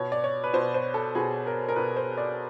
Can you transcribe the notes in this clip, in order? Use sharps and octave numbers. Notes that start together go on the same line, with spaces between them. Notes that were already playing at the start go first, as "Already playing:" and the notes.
Already playing: B2 C#5
D5
C#5
B4
B2 C5
C5
A4
B2 G#4
A#4
A#4
B2 B4
C5
D5